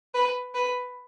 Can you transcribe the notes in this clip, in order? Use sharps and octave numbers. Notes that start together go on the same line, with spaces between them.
B4
B4